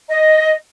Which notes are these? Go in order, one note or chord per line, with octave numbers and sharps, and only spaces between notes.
D#5